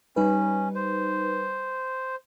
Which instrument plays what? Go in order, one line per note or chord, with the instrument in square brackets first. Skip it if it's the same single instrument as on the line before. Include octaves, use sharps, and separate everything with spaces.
[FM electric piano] G3 D#4 B4 [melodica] C#4
[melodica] C5